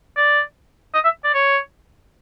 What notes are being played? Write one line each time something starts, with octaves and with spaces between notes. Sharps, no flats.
D5
D#5
E5
D5
C#5